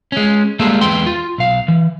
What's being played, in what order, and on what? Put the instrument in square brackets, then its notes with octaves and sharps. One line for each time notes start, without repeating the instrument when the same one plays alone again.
[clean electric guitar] G#3 C#4
G3 G#3 A#3 F4 A4
E2 G#3 B4 G5 C6
F4
B1 F5
E3